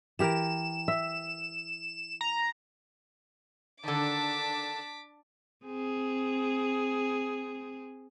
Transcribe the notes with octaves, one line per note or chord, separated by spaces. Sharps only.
E3 G4 A#4 E7
E5
A#5
D3 D#3 D4 A5 D6 B6
C4 G#4